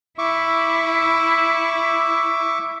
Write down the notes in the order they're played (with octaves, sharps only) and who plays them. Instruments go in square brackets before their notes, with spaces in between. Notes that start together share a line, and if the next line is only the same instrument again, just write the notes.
[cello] E4 [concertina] E5 C#6 D6